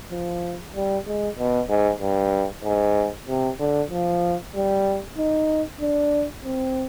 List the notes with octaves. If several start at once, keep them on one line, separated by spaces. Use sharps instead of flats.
F3
G3
G#3
B2
G#2
G2
G#2
C3
D3
F3
G3
D#4
D4
C4